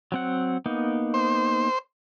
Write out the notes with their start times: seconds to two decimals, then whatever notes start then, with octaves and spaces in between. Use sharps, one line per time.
0.12 F#3 C4 F#5
0.66 A#3 B3 D#4
1.14 C5